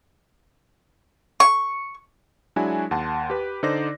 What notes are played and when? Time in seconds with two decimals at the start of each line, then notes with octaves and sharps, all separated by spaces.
1.40 C#6
2.56 F#3 G#3 D4 E4 F#4 G#5
2.91 D#2 F#5 A5 C6
3.30 G4 B4
3.63 D3 D#4 C5 D5 D6 A#6